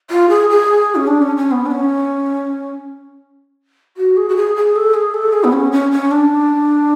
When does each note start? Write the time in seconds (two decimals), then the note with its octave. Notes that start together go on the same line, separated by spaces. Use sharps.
0.10 F4
0.29 G#4
0.50 G#4
0.95 C#4
1.07 D4
1.22 C#4
1.37 C#4
1.51 B3
1.66 D4
1.71 C#4
3.97 F#4
4.17 G#4
4.29 F#4
4.36 G#4
4.56 G#4
4.76 A4
4.94 G#4
5.14 A4
5.33 G#4
5.44 B3
5.52 C#4
5.72 C#4
5.91 C#4
6.11 D4